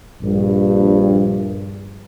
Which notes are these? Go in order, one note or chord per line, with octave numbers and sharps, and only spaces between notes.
A#1 G2